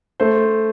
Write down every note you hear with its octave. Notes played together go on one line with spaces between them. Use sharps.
A3 C5